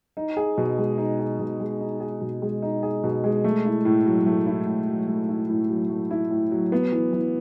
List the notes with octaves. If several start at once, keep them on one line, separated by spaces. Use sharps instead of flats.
D#4
G#4
B2
G#3
D#4
G#4
B2
G#3
D#4
G#4
B2
G#3
D#4
G#4
B2
G#3
A3
E4
A2
F#3
A3
E4
A2
F#3
A3
E4
A2
F#3
A3
E4
A2
F#3
B3
E3
E3